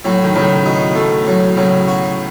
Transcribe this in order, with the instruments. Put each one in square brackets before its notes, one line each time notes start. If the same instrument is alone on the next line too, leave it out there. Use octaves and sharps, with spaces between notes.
[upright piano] A2 [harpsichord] F#3
[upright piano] D#3
[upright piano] A2 C#3 [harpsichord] F#3
[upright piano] B2 [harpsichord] D#4
[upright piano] B2 [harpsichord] A3
[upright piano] B2 [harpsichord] F#3
[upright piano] A2 C#3 [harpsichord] F#3
[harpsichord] F#4